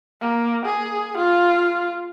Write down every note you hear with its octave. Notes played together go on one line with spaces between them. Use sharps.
A#3
G#4
F4